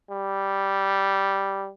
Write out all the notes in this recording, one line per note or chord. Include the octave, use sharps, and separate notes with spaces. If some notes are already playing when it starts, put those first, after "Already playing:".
G3